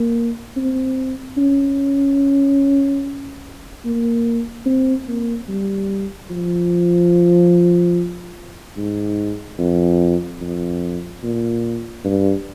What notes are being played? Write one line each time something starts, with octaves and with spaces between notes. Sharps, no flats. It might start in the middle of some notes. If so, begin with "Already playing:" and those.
Already playing: A#3
C4
C#4
A#3
C4
A#3
G3
F3
G#2
F2
F2
A#2
G2